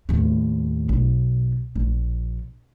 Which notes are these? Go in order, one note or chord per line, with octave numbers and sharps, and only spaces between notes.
D#2 A2
B1
A#1